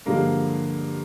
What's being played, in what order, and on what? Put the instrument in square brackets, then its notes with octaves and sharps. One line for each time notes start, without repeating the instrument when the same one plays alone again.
[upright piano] G2 D3 F3 G#3 A#3